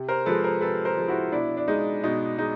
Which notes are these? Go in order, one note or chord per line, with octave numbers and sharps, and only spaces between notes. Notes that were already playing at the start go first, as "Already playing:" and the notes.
Already playing: C3
A#4 C5
F3 G#3 A4 B4
A#4 C5
C3 A4 B4
A#4 C5
F3 G#3
E4 F#4
B2 D4 E4
D4
G#3 D#4
B2 D#4
G#3 D#4